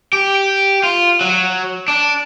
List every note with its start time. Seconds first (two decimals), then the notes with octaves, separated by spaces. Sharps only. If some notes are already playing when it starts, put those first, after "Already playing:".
0.13 G4
0.83 F4
1.21 F#3
1.88 D4